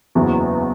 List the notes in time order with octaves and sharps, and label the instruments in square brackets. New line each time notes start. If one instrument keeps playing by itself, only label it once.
[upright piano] F#1 E2 C#3 E3 F#4